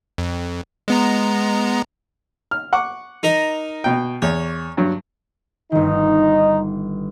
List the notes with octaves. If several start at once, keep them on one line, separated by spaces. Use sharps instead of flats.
F2
G#3 B3 A#5
F6
F#5 C#6 D6
D#4 A#4 D#5
B2 G5
E2 C#5
G2 F#3
G1 D#3 D#4